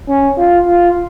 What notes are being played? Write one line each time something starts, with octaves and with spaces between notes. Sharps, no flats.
C#4
F4
F4